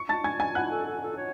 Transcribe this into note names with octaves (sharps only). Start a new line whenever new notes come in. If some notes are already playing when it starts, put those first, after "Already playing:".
Already playing: C#6 C#7
A5 A6
G#5 G#6
G#5 G#6
E4 F#5 F#6
A4
A4
A4
C#5